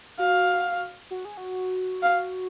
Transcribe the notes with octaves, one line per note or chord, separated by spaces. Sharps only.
F#4 F5
F#4
G#4
F#4
F5